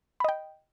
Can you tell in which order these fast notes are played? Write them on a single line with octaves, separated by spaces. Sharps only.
B5 D#5 G5